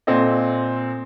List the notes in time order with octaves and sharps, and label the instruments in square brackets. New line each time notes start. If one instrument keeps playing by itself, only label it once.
[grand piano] A#2 C4 A4 D#5